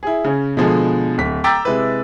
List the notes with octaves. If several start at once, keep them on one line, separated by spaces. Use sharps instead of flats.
E4 G#4
C#3 C#4
B2 D3 F3 G#3 G#4 A4
D1 B6
G5 A#5 D6 E6 A6 B6
C3 G#3 E4 B4